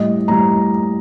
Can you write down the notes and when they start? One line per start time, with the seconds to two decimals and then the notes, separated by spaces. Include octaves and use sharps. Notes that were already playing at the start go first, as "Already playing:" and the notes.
Already playing: A2 G3 D#5
0.28 A2 G3 A#5